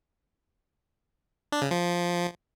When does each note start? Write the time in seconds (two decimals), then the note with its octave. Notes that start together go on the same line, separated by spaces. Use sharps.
1.52 D4
1.62 C#3
1.71 F3